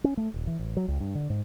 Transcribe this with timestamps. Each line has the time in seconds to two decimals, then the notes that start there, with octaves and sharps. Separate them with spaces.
0.04 C#4
0.17 A3
0.34 D#1
0.47 E3
0.59 A1
0.77 F#3
0.88 C#2
1.00 G2
1.15 D3
1.30 G#2